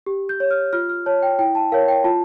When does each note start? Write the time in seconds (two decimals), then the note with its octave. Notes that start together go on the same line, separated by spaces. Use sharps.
0.06 G4
0.29 G6
0.40 C#5
0.51 F6
0.73 F4 F6
0.89 F6
1.06 C#5 A5
1.23 G5
1.39 E4 G5
1.55 A5
1.72 A#4 C#5 F5
1.88 G5
2.04 F4 A5